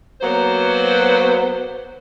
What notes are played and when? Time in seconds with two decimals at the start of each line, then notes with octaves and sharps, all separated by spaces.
0.21 F#3 A#3 B3 C5